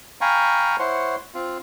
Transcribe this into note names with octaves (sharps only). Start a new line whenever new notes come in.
F5 G5 G#5 A#5 B5 C#6
E4 C5 C#5 F#5 C6
C4 F4